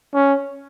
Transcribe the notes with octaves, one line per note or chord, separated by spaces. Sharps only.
C#4